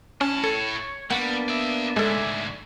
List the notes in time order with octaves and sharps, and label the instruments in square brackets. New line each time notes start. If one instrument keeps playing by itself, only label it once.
[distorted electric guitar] A2 A5 [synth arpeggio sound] C#4
[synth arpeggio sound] A4 [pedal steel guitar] C#5
[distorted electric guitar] G3 [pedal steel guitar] A#3 B3 D4 [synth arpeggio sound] F#5
[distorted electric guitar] D5 E5
[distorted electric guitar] D2 G#2 [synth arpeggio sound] G#3 A4 [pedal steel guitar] D5 E5 G#5